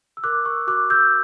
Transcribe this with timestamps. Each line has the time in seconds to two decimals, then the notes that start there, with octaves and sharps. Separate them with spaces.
0.17 E6
0.24 A#4 D6 F#6
0.45 C#6 E6
0.67 F#4 D6 F#6
0.90 E6 G6